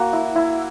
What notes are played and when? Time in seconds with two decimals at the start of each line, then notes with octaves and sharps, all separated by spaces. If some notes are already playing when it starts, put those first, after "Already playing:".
Already playing: A#3 F#4
0.13 E4
0.35 E4